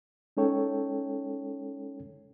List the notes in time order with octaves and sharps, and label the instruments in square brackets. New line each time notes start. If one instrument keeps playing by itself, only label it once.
[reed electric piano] G#3 C#4 D#4 A4 C#5 G5